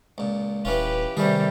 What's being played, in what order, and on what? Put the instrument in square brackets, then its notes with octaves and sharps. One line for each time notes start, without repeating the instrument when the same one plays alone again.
[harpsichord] C#2 A#2
[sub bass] D#1 [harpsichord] E3 C#4 F4 [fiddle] G4 B4
[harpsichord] C3 A3 G#4 [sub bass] D#3 [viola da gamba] G3